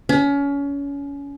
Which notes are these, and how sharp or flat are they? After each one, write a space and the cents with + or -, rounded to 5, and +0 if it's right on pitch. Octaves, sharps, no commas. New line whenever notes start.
C#4 +30